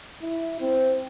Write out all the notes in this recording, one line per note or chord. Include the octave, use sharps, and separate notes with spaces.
E4
C4